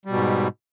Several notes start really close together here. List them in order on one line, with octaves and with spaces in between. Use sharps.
G3 B2 G#2